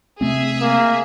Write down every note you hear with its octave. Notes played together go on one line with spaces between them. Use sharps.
C3 A3 C4 G#4 E5
A#3